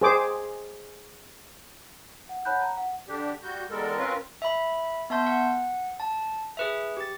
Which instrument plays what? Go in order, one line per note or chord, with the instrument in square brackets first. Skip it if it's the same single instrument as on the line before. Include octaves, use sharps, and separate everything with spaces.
[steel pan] G#4 C5 D6
[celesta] F#5
C#5 F#5 A5 B5 F#6 G6
A#5
F#5
[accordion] D3 D4 G4
G3 F#4 G6
E2 G3 G#3 A4 A#4
C4 C#4 F4 A#4 B4
[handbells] E5 B5
B3 E5 A5 C6 G6
F#5
A5
G#4 B4 E5
G4 A6